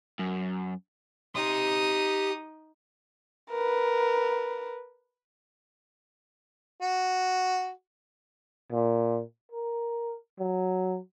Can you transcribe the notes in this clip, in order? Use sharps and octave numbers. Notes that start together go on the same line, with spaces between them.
F#2
D#4 G4 C6 D#6
A#4 B4
F#4
A#2
A#4
F#3